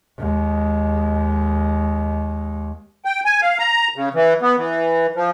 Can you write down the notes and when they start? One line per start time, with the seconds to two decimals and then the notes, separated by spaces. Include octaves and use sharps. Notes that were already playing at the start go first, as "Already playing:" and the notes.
0.18 D#2 G#3
3.05 G5
3.25 G#5
3.42 F5
3.59 A#5
3.96 C#3
4.14 E3
4.42 B3
4.58 E3
5.15 F3